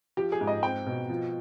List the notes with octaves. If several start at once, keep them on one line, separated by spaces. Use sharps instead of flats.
F3 G4
G#4
G#2
D#5
C4 G5
B2
F3